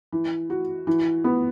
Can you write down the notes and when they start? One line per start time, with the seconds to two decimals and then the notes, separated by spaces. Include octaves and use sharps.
0.12 E3
0.50 F#4
0.87 E3
1.24 B3